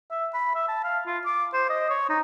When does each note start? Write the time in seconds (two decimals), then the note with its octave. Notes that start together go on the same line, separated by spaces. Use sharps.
0.11 E5
0.34 B5
0.54 E5
0.68 A5
0.83 F5
1.06 F4
1.25 D6
1.53 C5
1.70 D#5
1.90 C#5
2.09 D#4